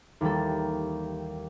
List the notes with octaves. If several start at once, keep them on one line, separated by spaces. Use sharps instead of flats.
D#2 E3 G3 A4